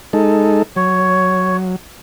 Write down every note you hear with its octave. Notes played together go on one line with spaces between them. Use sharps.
G#3 D#4 A4
F#3 C#5